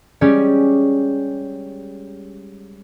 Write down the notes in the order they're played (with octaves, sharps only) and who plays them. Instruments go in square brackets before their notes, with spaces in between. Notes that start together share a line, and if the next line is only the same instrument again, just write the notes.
[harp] G3 G#3 C#4 G4 C#5 D5